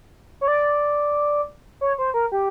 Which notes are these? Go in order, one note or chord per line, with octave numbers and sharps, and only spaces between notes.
C#5
D5
C#5
C5
A#4
G4